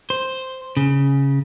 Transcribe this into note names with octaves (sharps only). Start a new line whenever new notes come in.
C5
C#3